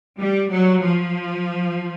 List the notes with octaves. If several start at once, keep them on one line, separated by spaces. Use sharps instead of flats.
G3
F#3
F3